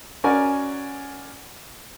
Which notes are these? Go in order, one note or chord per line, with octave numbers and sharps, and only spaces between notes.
C#4 F#4 A#4 D5 G#5